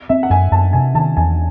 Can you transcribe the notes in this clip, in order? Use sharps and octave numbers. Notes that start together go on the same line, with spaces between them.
C4 E5
F#5
F#2 G#5
F#2 A5
C3 G#5
D#3 A5
E2 G#5